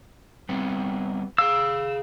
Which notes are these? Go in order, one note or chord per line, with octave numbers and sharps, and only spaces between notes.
G3 B3 C4
G#4 F5 E6